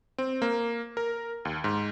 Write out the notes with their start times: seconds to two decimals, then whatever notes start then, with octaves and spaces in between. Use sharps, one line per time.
0.18 C4
0.42 A#3
0.97 A#4
1.45 D#2
1.64 G#2